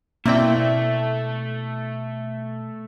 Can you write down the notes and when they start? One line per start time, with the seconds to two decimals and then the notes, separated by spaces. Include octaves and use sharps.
0.26 B2 A3 A#3 C4 E4 D5 G5